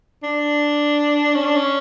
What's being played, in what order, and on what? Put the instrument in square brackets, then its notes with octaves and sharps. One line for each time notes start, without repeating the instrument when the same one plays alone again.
[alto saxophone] D4
C#4
D4
C#4